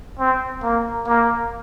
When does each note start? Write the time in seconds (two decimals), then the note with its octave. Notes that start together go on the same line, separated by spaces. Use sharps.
0.19 C4
0.63 A#3
1.07 A#3